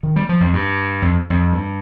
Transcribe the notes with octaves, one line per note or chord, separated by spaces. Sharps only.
D#3
G3
F3
F2
G2
F2
F2
G2